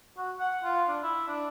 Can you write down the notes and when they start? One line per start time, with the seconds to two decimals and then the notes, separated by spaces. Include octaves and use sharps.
0.18 F#4
0.39 F#5
0.64 F4
0.88 D4
1.03 E4
1.28 D4